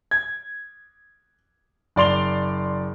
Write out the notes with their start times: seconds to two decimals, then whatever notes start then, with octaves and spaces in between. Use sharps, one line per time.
0.11 G#6
1.96 F#1 D5 C6 F7 G7